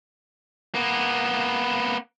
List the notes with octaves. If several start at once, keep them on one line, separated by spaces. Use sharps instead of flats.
A#3 B3